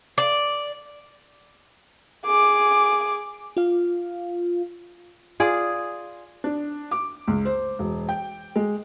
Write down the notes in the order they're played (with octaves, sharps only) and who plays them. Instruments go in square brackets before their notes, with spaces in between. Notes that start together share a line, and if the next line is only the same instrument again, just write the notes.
[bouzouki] D5
[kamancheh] G#4 D6
[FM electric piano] F4 F5
[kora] F4 G#4 D5
[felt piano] D4
D6
C#2
C5
E1
G5
G#3